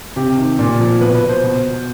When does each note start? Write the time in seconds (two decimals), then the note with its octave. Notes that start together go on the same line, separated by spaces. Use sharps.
0.16 C3 G4
0.37 D#3
0.59 A#2
0.80 F3
1.01 B2 B4
1.15 B4
1.29 C5
1.43 B2